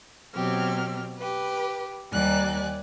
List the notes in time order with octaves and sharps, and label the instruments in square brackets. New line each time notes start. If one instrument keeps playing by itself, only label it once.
[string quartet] B2 F#3 C4 G4 F6
G4 B4
D#2 G3 D5 G#5 F#6